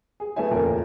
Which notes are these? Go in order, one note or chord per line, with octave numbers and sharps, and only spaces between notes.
G#4
A3 B3 E4 E5 G#5
D#1 F2 C#3 A#4